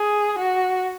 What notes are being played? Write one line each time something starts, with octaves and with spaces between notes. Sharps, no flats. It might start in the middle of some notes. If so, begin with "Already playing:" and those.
Already playing: G#4
F#4